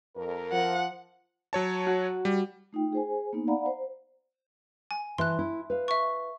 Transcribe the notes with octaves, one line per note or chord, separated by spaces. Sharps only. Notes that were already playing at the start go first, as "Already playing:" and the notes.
F2 A#4
F3 F#5
F#3 C#5 A5
F#4 F#6
G3
A3 D#4 F4 G5
G#4 C5 G#5
A#3 B3 D#4
D5 F5 F#5 A#5 B5
C5
G#5
E3 A5 C6 F#6
E4
B4 F5
E5 C#6